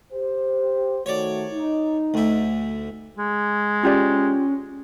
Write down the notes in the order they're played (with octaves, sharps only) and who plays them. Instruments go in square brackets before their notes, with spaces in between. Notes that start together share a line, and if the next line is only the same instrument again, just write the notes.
[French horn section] G4 C5
[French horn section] D#3 A3 F#4 [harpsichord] C#5 D5
[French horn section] D#4
[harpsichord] D2 E4
[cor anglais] G#3
[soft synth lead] C#4 [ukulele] F4 G4 D5